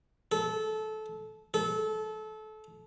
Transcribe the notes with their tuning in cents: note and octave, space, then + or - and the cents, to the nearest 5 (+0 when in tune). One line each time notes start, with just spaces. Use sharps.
A4 -20
A4 -25